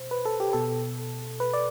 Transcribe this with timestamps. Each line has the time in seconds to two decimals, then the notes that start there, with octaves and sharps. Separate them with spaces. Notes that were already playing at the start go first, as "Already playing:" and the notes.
Already playing: B2 C5
0.11 B4
0.25 A4
0.40 G4
0.53 B2 A4
1.40 B4
1.53 D5